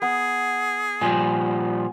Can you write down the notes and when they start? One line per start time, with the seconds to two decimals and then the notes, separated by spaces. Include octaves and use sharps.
0.02 B3 G#4
1.01 A#2 F3 G3 G#5